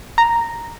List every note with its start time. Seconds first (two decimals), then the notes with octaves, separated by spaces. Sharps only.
0.18 A#5